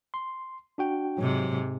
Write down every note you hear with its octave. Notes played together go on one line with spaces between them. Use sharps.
C6
D4 F#4 G5
G#2 C3 F#3